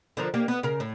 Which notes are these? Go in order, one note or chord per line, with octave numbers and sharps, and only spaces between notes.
D3 F3 A#4
A#3 D4 G4
B3
C#3 A#4
A2